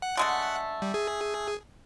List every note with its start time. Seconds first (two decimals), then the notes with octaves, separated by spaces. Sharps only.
0.02 F#5
0.17 D3 G#3 A3
0.82 G3
0.94 G#4